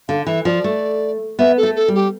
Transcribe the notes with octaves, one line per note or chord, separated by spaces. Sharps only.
D3 F5
E3 E5
F3 D5
A3
B3 E5
A4
A3
A4
G3
G4